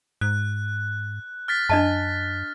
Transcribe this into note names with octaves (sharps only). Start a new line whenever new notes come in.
G#2 F#6
F6 A6 B6
F#2 D4 D#5 A5